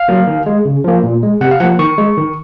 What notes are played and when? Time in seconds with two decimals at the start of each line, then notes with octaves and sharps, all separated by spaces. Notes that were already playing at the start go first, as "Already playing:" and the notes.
Already playing: F5
0.08 F#3 A#3
0.27 D#3
0.46 G#3
0.65 C#3
0.84 F3 A#3
1.03 A#2
1.23 G#3
1.41 C3 F#5
1.51 F5
1.60 F3 A#3 F#5
1.79 D#3 C#6
1.98 G#3
2.17 D#3